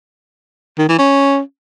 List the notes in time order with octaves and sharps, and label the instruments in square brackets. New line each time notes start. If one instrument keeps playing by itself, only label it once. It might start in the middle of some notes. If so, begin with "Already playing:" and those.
[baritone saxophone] D#3
E3
C#4